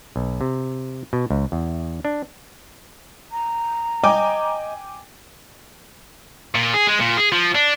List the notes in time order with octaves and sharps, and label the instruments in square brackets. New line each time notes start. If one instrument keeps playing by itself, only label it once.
[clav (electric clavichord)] B1
C3
B2
C#2
E2
D4
[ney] A#5
[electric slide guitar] D#5 [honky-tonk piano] G5 G#5 D6
[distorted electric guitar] A#2
G#4
G#3
A#2
G#4
F3
D4